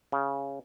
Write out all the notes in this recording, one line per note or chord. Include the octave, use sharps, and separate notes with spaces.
C#3